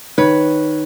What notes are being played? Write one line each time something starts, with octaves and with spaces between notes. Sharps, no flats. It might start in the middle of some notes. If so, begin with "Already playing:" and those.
D#3 B4 C#5